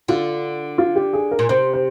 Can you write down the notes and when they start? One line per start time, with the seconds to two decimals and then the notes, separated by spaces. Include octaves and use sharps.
0.08 D3 F4
0.78 F4
0.96 G4
1.13 G#4
1.31 A#4
1.39 A#2
1.49 C3 C5
1.74 C5